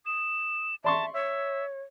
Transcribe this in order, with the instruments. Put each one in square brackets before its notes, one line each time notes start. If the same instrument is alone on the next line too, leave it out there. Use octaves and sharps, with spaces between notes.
[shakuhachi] D#6 [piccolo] E7
[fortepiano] D5 C6 C#6 [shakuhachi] E5 [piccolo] A5
[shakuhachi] C#5 [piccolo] E5